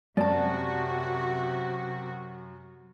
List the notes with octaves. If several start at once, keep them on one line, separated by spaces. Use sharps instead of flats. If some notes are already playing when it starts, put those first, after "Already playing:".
F#2 C3 F#4 D5 A5